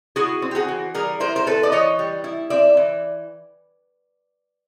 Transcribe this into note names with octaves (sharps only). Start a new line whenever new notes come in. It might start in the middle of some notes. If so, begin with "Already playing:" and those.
E4 F#4 G#4
C4
G4
F#4 G#4
E3
G3 G#4 A#4
E4 A#4 C5
C5
C4 A4 B4
D5
E3 C#5 D#5
G3
E4
C4 D5 E5
E3